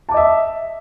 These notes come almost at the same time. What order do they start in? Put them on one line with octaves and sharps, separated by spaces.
A5 D6 D#5 E5